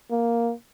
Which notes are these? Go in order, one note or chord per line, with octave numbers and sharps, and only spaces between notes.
A#3